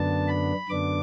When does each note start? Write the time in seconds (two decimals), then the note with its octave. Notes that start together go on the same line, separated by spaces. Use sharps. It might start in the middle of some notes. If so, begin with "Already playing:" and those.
Already playing: F#2 D3 B3 D4 A5
0.28 B5
0.69 F#2 D3 B3 D4 D6